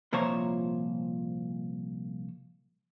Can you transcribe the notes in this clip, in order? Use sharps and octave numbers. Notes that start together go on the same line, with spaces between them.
C2 A#2 F3 C5 C#5 A#5